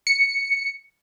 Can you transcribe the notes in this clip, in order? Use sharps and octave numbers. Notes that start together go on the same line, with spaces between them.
C#7